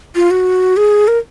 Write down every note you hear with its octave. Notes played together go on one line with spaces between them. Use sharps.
F4
F#4
G#4
A#4